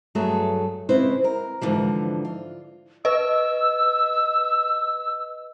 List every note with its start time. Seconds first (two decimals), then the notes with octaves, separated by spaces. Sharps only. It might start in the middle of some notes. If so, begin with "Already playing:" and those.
0.15 G2 F#3 A3 B3 G#4 A4
0.89 C#3 G#3 C4 E4 B4 C5
1.24 A#4
1.61 G#2 B2 D3 E3 F3
2.25 F4
3.05 B4 D#5 E6